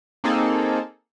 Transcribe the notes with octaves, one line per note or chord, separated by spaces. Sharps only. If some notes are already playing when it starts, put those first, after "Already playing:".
A#3 C4 D#4 G#4 A4